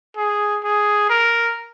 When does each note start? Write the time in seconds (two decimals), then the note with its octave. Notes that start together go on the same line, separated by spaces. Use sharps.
0.16 G#4
0.64 G#4
1.09 A#4